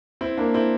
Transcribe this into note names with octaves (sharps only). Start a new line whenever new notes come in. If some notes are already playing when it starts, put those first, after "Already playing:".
C4 E4
A#3 D4
C4 E4